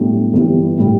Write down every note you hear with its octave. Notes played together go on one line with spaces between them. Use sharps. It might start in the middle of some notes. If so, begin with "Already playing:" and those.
Already playing: B1 A2 G3 D4
G1 G2 E3 G3
A2 G3